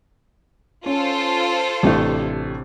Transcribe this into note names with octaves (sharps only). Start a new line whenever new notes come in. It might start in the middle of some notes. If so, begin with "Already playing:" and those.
C#4 F4 A4 C5
A1 C3 A3 D4